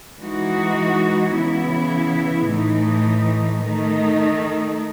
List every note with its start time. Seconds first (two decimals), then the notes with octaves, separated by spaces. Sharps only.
0.18 E3 G#3 D#4 F#4
1.34 C#3 E3 B3 E4
2.49 A2 E3 A3 D#4
3.65 D#3 A3 D#4